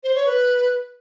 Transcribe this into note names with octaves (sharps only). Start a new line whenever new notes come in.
C5
C#5
B4